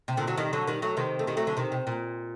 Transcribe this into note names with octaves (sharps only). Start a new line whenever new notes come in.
C3
A#2 D3
D3 F#3
D#3 G3
D3 F#3
D#3 G3
F#3 A3
C3 D#3
A3
D#3 G3
F#3 A3
D3 F#3
C3 D#3
C3
A#2